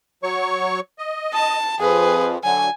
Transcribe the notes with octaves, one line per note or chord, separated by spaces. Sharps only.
F#3 C#5 C#6
D#5
A5
F2 F3 G#4 B4
D3 F#3 G#5